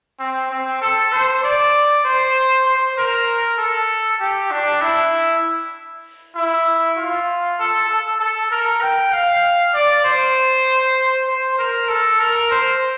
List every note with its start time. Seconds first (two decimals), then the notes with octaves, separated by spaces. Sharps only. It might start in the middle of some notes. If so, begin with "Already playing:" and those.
0.20 C4
0.51 C4
0.81 A4
1.13 C5
1.43 D5
2.05 C5
2.66 C5
2.98 A#4
3.58 A4
4.20 G4
4.51 D4
4.81 E4
6.36 E4
6.97 F4
7.59 A4
7.89 A4
8.20 A4
8.51 A#4
8.82 G5
9.13 F5
9.74 D5
10.05 C5
11.27 C5
11.59 A#4
11.89 A4
12.20 A#4
12.51 C5